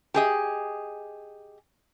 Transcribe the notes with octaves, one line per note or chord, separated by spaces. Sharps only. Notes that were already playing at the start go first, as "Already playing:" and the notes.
G4 G#4 D#5